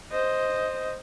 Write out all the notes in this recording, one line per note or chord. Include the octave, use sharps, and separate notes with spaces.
C5 D#5